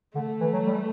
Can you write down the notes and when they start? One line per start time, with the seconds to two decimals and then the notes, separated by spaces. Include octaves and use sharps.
0.15 D3 A3
0.41 E3
0.53 F#3
0.67 G3